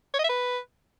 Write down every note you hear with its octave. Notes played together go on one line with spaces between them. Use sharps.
C#5
D#5
E5
B4